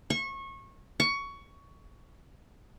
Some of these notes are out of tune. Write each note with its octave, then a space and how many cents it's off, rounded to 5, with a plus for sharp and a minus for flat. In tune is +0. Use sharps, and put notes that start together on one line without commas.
C#6 -25
C#6 +15